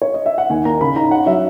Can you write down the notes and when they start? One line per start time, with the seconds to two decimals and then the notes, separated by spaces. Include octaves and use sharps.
0.02 C#5
0.14 D#5
0.26 E5
0.38 F#5
0.49 D#2 G#5
0.65 A#3 A#5
0.81 C#3 B5
0.96 D#4 A#5
1.11 C#4 F#5
1.26 F#3 E5